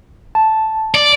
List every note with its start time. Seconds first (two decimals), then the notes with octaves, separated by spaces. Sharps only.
0.35 A5
0.95 D5